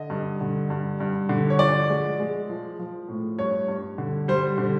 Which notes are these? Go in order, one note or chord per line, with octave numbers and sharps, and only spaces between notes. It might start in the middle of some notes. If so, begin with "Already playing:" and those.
Already playing: D3 D#5
G2
D3
G2
G2
D3
C#5
F3 D5
G#3
G#3
F3
F3
A2
G2 C#5
G2
D3
G3 C5
D3